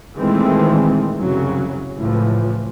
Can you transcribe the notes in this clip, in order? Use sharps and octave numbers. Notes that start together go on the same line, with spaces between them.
A#2 D#3 E3 G#3 A3 C4
C2 F#2 C#3 F#3
C#2 A2 E3 F3